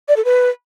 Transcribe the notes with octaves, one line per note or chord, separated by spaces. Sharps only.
D5
A4
B4